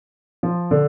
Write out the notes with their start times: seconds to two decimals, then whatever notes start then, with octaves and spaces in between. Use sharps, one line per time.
0.43 F3
0.71 D3